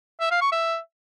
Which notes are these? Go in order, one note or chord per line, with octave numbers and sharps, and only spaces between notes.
E5
F5
C#6
E5